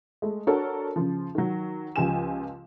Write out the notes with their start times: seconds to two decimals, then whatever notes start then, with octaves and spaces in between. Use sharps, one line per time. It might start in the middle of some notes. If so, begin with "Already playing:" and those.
0.22 G#3 A3
0.47 D4 F#4 A4 A#4 C#5
0.96 C#3 F3
1.35 D#3 F#3
1.96 C#2 F3 F4 G4 G#5 E7